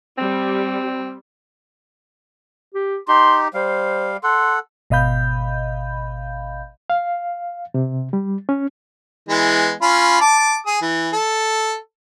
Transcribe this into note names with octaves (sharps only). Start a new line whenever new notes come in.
G3 C4
G4
D#4 G4 C6
G3 C5 F5
A4 F#5 C6
G#1 B2 D#5 F5 B5 G6
F5
C3
G3
C#4
E3 G#3 B3
C#4 F4 B5
A5 D6
G#4 D#6
E3
A4